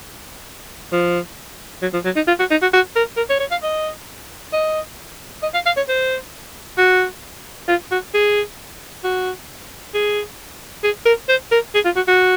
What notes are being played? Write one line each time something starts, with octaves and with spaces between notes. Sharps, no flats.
F3
F#3
F3
F#3
D#4
F4
F#4
D#4
F#4
F#4
A#4
A#4
C#5
C#5
F5
D#5
D#5
D#5
F5
F5
C#5
C5
F#4
F4
F#4
G#4
F#4
G#4
G#4
A#4
C5
A#4
G#4
F4
F#4
F#4